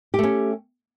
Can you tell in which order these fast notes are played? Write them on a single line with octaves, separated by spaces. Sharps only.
G4 A3 C#4